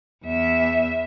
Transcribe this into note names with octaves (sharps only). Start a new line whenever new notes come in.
E2 E5